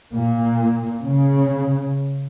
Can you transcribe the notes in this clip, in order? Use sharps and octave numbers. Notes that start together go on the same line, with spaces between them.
A#2
C#3